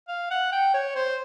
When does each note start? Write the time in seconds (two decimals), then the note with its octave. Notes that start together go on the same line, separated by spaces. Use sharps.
0.08 F5
0.31 F#5
0.52 G5
0.74 C#5
0.95 C5